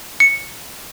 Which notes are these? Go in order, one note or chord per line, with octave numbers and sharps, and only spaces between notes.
C#7